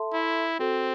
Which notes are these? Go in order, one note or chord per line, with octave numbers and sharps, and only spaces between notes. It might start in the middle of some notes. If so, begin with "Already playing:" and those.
Already playing: A4 E5 A5 C6
E4
C4 F#4 A4 C5